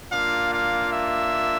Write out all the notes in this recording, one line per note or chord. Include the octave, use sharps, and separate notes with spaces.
A#3 D4 F4 F5
F5
E5